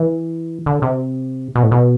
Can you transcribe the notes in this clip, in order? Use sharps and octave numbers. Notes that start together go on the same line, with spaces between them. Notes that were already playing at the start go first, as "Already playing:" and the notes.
Already playing: E3
D3
C3
B2
A2
B2